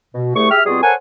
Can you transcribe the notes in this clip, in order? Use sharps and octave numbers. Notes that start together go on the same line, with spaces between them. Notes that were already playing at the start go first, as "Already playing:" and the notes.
B2
C2 A3 G#4 C#6
G4 G#4 E5 F6
B2 G3 C4 F4 F#4 G#4
A4 A#4 C5 C#5 F#5 G#5